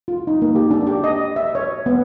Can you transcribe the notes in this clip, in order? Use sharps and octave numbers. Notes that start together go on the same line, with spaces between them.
F4
D#4
A#3
G4
D4
G4
D#5
E5
C#5
B3